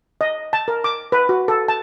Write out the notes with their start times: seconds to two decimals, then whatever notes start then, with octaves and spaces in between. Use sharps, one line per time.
0.21 D#5
0.53 A5
0.68 A#4
0.84 D6
1.12 B4
1.29 F#4
1.48 A4
1.68 A5